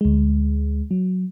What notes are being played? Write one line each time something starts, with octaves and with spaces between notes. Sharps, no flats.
D2 G#3
F#3